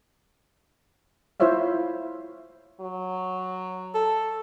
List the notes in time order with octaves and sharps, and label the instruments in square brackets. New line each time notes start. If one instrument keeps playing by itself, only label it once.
[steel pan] E4 F4 C5 C#5 E5 F5
[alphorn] F#3
[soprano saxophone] A4